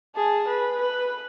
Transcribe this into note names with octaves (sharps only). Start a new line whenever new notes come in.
G#4 A5
B4
B4